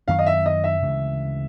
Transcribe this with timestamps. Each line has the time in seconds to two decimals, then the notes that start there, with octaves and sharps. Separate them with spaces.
0.08 F#2 D#3 F#3 B3 F5
0.19 D#5
0.26 E5
0.46 D#5
0.64 E5
0.82 D2 C#3 E3 G#3